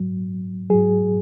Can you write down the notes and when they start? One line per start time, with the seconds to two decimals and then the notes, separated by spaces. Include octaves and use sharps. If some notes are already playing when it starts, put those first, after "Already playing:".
Already playing: G#2 F#3
0.70 G#2 F#3 G#4